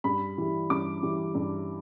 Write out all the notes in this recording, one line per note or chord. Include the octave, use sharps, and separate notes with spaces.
G2 B5
E3 G3
G2 D6
E3 G3
G2